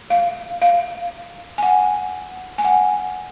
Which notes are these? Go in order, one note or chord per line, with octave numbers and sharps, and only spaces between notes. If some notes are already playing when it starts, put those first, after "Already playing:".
F5
F5
G#5
F#5
G#5
F#5